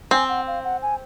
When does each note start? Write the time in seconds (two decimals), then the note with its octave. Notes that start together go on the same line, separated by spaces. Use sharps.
0.11 C4 G#5
0.29 F#5
0.47 F5
0.64 F#5
0.82 G#5